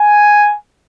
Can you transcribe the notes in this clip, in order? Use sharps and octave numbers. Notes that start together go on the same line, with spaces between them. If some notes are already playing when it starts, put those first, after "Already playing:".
Already playing: G#5